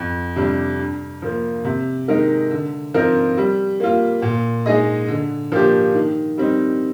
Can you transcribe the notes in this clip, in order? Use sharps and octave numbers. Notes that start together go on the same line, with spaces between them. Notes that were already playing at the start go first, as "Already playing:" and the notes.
Already playing: F2
C3 G3 D4
G2
F3 A#3
C3
D#3 G#3 D#4 A#4
D3
F3 C4 D#4 A#4
G3
A#3 F4
A#2
G#3 D#4 G#4 D#5
D3
F3 A#3 D4 G4
D#3
G3 C4 D#4